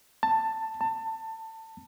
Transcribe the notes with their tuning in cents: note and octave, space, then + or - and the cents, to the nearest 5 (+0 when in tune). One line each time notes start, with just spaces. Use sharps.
A5 +15
A5 +25